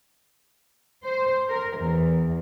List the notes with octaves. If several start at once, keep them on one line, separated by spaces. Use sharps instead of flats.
C5
A#4
E2